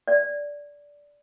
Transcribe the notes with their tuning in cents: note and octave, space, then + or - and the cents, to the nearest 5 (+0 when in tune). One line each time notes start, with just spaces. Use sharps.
D5 -10